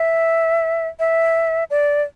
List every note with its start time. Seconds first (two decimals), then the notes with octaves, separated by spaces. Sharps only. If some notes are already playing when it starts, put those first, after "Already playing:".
Already playing: E5
0.99 E5
1.70 D5